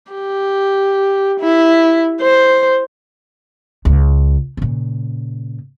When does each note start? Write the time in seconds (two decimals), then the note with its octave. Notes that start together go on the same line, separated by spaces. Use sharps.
0.12 G4
1.40 E4
2.21 C5
3.85 C#2
4.57 A#2 C#3